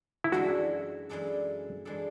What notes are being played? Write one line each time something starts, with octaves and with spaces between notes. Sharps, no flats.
E4
F#2 E3 G#3 D4 F#4 A4
F#2 E3 G#3 D4 A4
E3 G#3 D4 A4